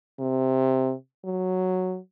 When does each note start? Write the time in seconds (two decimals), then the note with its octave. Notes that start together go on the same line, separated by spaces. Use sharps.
0.19 C3
1.25 F#3